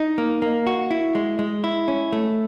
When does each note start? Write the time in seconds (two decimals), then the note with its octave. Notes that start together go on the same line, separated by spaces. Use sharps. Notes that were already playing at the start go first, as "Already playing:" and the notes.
Already playing: D#4
0.18 A#3
0.42 A#3
0.67 F#4
0.91 E4
1.15 G#3
1.39 G#3
1.64 E4
1.88 C#4
2.13 A3